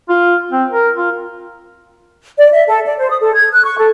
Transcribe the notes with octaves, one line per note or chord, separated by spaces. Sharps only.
F4
C4
A#4
F4
D5
E5
A4
D5
C5
D#6
A4
G#6
F#6
C#6
A4